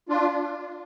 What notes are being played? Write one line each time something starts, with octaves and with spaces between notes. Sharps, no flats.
D4 F4